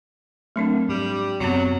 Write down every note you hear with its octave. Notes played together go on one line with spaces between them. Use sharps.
F#3 A3 C4 D4 A#4 A5
G#2 G3
F#2 C3 F#3 B3 C4